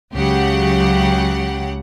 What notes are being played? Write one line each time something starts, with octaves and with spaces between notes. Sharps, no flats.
C#2 C#3 F#3 G4 F#5